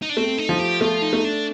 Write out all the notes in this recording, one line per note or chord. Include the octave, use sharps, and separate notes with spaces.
D#4
D4
A3 C4
D#4
F3
G4
A3 F4
D#4
A3
D4